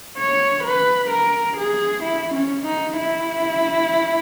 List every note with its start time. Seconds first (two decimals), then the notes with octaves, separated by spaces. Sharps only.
0.18 C#5
0.64 B4
1.10 A#4
1.57 G#4
2.04 E4
2.35 C#4
2.66 D#4
2.97 E4